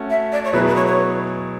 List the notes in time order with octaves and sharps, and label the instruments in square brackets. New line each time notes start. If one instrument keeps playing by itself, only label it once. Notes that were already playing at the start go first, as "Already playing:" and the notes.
Already playing: [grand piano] A3 C#4 F#4
[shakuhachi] E5
D5
C#5
[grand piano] B2 F#3 B3 E4 G#4 [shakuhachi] B4
[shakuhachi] B4
C#5
C#5